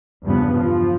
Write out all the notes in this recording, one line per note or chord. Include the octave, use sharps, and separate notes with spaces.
E2 G2 C#3 F3 B3
F3